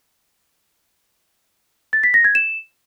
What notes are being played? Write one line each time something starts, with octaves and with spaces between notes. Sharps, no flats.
A6
B6
A#6
G#6
E7